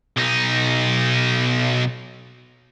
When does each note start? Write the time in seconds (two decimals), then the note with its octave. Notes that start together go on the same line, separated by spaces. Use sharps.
0.17 B1 D#4